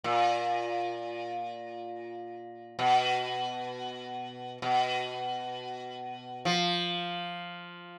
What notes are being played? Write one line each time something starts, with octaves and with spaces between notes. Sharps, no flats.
A#2
B2
B2
F3